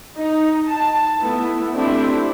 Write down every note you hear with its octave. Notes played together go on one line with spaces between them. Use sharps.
D#4
A5
A3 B3 E4
A3 C4 D4 E4 G4